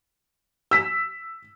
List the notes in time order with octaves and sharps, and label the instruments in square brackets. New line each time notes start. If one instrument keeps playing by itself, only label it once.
[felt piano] E6 B6